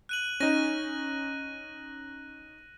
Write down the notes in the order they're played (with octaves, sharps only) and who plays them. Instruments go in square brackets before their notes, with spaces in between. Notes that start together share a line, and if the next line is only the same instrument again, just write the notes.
[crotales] F#6 D#7 F#7
[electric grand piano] C#4 D#4 [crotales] F#6 A#6 D#7